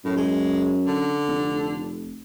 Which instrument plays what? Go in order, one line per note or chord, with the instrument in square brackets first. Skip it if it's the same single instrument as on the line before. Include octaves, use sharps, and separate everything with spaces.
[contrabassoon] F#2 [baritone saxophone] A2
[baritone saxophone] G#3
D3
[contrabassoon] F1